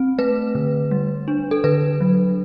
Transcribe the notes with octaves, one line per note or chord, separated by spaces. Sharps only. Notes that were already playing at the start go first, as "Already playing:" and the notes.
Already playing: C4
A3 B4
D3
G3
D4
A4
D3 B4
F#3